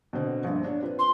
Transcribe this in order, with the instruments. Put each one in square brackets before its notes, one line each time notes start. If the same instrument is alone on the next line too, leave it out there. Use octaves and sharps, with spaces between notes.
[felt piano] B2 D3 C4
A#1 G2
D4 C#5
C4 F4 B4
[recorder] C6